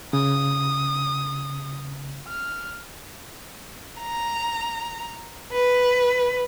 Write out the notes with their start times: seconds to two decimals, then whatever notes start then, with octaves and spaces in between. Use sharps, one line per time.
0.13 C#3 D#6
2.28 F6
4.00 A#5
5.51 B4